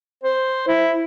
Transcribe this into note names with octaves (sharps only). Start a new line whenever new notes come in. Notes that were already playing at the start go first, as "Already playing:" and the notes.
C5
E4